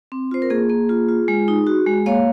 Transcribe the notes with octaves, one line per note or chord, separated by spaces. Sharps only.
C4
F4 C5
A#4
A#3 G#4
A#3
F4
F4
G#3
D#4
F#4
G#3
A#3 C#5 F5